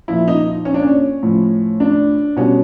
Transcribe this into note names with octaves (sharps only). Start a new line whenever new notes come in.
A#2 F3 E4
D#4
C#4
D4
C#4
A2 F3
D4
B2 G3 C#4